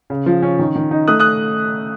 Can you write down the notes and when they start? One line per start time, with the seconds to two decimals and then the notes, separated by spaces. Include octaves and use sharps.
0.10 C#3
0.26 F3
0.42 C#4
0.59 D#3
0.76 D#3
0.91 D#4
1.08 A3 D#6 F#6
1.20 D#6 F#6